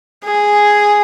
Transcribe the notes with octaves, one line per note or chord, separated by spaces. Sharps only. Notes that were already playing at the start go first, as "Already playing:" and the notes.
G#4